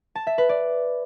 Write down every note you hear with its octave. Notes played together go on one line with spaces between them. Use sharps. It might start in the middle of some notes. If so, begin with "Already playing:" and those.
A5
E5
B4
D5